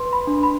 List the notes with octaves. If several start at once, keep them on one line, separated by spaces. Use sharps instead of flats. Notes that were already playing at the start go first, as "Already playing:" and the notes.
Already playing: B4 C6
B5
D4
B5